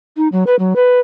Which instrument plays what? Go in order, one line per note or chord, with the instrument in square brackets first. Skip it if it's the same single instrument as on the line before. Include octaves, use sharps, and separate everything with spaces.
[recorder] D#4
F#3
B4
F#3
B4